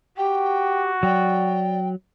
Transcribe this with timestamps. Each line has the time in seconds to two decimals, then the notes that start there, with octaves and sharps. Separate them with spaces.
0.17 F#4 G4 G5
1.03 F#3 D5 G5